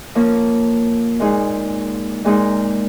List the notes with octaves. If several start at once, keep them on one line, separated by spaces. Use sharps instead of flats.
F3 A#3 C#4
A#2 G#3 D#4 G#4
A#2 G#3 D#4 A#4